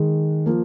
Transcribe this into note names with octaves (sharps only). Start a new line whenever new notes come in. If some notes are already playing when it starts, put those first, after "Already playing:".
Already playing: D#3 G#3
F3 A#3